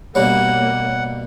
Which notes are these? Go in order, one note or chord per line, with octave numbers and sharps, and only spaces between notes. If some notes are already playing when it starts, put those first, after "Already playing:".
G2 B2 G3 A#3 C#5 F#5